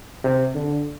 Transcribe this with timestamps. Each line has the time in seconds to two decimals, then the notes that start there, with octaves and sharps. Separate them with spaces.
0.24 C3
0.55 D3